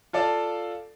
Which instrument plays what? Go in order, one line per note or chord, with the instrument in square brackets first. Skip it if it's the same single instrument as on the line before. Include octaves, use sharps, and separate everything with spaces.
[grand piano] F4 A4 D5 F5 A5